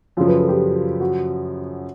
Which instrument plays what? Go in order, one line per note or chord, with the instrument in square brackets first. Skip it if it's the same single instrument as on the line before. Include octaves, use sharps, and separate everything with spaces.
[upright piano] F#2 C#3 F3 [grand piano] F4
[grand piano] B4
A4
G4
F#4